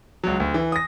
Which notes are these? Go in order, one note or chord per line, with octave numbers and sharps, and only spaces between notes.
C#2 F#3
D2
E3
D#6 A#6